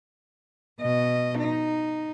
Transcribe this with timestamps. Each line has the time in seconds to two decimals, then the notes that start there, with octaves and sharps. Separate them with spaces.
0.81 B2 D#5
1.39 D#4